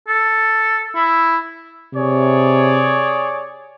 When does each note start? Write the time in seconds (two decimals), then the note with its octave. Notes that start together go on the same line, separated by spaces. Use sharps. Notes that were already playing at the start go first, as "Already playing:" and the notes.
0.08 A4
0.95 E4
1.94 C3 G#4 C#5 D5